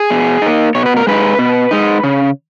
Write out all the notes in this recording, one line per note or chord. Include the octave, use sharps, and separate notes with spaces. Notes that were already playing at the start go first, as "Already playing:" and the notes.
Already playing: G#4
B2
A#3 D#4
B2 C#5
B4
A#4
G#3 D#4 B4
B2
G#3 D#4
C#3